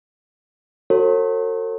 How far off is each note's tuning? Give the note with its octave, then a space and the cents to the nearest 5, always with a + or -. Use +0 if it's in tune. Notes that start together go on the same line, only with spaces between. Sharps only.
F#4 +0 A4 +45 C#5 -45